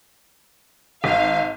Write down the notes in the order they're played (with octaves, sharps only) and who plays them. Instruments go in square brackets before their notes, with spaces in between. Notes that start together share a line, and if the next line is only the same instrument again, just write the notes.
[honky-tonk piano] G#1 [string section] F5